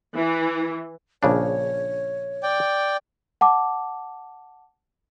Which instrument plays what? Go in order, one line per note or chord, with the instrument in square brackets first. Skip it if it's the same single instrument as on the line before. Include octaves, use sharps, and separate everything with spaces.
[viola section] E3
[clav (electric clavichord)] A#1 C#3 D4 [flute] C#5
[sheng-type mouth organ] D5 G5
[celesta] F#5 A5 D6